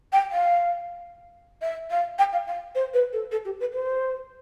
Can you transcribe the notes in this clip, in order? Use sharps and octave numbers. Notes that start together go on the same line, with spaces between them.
G5
F5
E5
F5
G5
F5
F5
C5
B4
A4
A4
G4
B4
C5